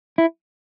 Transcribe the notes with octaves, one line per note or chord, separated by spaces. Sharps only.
E4